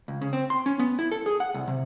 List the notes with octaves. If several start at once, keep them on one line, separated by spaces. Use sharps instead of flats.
C#2
C#3
C4
C6
C#4
B3
E4
A4
G#4
F#5
C2
C3